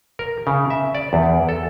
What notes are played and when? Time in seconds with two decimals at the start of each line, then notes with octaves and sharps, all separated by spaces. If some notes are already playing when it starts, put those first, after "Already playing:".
0.19 A#4
0.47 C#3
0.70 E5
0.95 D5
1.13 E2
1.49 A4